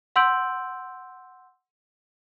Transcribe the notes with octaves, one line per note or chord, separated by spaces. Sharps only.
F#5 C6 E6 G6 D7 F#7